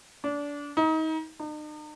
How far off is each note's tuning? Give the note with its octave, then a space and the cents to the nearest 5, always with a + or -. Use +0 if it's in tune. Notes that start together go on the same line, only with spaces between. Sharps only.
D4 -25
D#4 +30
D#4 -45